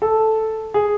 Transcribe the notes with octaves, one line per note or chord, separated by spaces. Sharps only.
A4
G#4